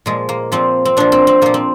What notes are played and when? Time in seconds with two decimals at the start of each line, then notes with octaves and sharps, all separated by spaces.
0.06 A#2 F3 G#3
0.29 A#3
0.52 A#2 F3 C4
0.85 C4
0.97 A#2 F3 D4
1.12 C4
1.27 C4
1.42 A#2 F3 A#3
1.54 C4